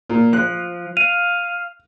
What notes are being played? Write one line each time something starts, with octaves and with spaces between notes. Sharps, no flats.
A#2
F3 F#6
F5 D#7